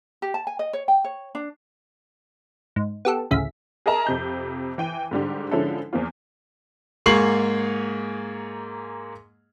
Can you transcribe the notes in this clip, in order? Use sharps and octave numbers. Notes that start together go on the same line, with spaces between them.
G4
A5
G#5
D#5
C#5
G5
C#5
D4
G#2
B3 G4 A4
A1 D2 C#3 E5 B6
G#4 A#4 D#5 E5 A5 A#5
F2 C3 G6
E3 G5 D#7
G#2 D3 G3 G4
D3 F3 G#3 C#4 E4 A4
E2 F3 A#3 C4 F4
G#2 A#3 G#4 C#6 C7 F#7